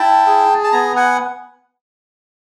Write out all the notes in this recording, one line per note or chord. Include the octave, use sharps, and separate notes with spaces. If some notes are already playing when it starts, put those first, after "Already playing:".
Already playing: E4 G5 A5
G#4
A5
B3 G#5 A#5
F#5 G#5